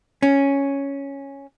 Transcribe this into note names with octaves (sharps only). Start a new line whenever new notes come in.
C#4